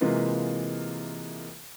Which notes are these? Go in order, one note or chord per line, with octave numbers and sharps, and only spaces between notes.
C3 E3 G#3 A#3 F4 B4